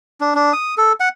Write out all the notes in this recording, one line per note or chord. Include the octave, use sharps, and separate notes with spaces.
D4
D4
D#6
A4
F#5